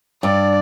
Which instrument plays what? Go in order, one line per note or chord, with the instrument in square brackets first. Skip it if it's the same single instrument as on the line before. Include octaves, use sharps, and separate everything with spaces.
[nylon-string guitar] G2 [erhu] D5